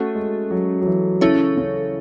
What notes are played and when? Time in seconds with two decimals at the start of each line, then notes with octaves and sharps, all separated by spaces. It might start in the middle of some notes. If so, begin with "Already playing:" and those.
Already playing: A3 C#4 F#4 A4
0.15 G#3
0.51 F#3
0.82 F#3
0.86 E3
1.21 C#3 C#4 E4 A4 C#5
1.57 C#3